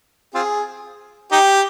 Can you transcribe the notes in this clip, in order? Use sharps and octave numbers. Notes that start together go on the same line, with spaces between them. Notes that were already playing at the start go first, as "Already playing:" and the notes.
C4 F4 G#4
D#4 G4